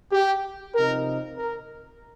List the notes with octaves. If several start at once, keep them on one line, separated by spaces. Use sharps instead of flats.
G4
C3 F3 D#4 A#4
A#4